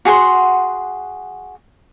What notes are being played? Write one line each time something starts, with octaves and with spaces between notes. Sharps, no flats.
F#4 G#4 F#5 C6